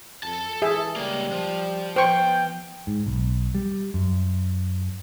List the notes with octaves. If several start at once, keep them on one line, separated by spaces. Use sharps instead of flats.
F2 A4 A5
E3 G#4 E5
C#2 G3 A#3
F3
B3 C5 G5 C#6
G#2
B1
G3
F#2